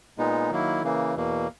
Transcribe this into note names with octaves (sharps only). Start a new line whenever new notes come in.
A#2 G#3 B3 D#4
D#3 F#3 A#3 E4
C#3 E3 A#3
E2 B2 A#3